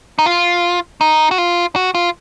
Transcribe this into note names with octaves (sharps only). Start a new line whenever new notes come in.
D#4
F4
D#4
F#4
F4
F#4
F4